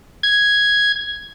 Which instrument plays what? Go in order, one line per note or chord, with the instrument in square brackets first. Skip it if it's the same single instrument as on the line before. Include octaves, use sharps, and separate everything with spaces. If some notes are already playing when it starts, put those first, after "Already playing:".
[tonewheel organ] G#6